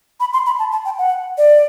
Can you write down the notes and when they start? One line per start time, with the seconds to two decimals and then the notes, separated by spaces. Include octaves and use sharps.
0.20 B5
0.33 C6
0.46 B5
0.59 A5
0.72 A5
0.85 G5
0.99 F#5
1.38 D5